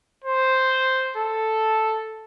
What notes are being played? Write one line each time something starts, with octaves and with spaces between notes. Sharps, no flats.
C5
A4